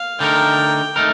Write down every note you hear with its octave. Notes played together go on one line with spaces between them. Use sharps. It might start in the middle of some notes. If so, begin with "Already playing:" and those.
Already playing: F5
D3 A3 D#4 A#4 G5
A3 D#4 A#4